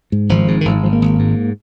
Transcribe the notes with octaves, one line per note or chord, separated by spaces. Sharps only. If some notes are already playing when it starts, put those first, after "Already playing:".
G#2
G#1 F3
G#2
D#3
G#1 F3
G#2 F3
A#3
G#1
G#2